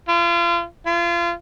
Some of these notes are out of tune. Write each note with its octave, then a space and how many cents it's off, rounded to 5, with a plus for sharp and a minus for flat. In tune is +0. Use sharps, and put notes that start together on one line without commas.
F4 -35
F4 -30